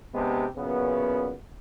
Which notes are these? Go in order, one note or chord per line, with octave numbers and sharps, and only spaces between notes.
C3 G#3 B3 C4 D4 G4
F#2 A#2 C#3 B3